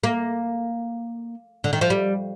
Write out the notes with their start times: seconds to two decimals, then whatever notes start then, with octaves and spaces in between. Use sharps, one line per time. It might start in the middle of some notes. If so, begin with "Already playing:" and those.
0.03 A#3
1.64 D3
1.73 D#3
1.81 F3
1.90 G3